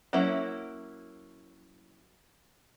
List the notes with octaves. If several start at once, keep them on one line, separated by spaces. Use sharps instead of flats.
F#3 A#3 C#4 E4